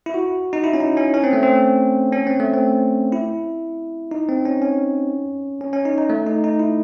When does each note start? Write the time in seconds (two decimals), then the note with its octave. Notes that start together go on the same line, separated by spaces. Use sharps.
0.06 E4
0.14 F#4
0.53 D#4
0.64 E4
0.73 C#4
0.80 D#4
0.97 C#4
1.14 C#4
1.24 C4
1.33 A3
1.43 C4
2.12 C#4
2.27 C4
2.40 A3
2.53 C4
3.12 E4
4.11 D#4
4.29 C4
4.45 C#4
4.62 C#4
5.61 C#4
5.73 C#4
5.85 D#4
5.98 D#4
6.10 A3
6.26 D#4
6.44 D#4
6.59 E4